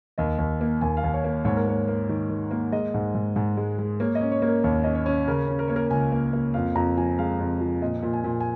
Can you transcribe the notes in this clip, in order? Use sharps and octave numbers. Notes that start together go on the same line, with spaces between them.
D#2 D#5
D#2
A#3
D#2 G#5
F5
D#2
C#5
A#3
G#2 C#5
A#4
A#3 C#5
A#3
D#3
D#3
A#3
G#3 D#5
G#2
G#2
G#2
G#3
G#3
A#3 C#5
D#5
C#4
C#5
A#3
A#4
D#2 C#5
C#4 D#5
C#5
C#4
C#3 A#4
C#4
A#4
A#3 C#5
A#4
C#2 G#5
A#3
A#3
F2 F5
F2 A#5
F3 G#5
G#3 F5
F2
F3
A#2 D#5
A#2
G#5
A#2
G#5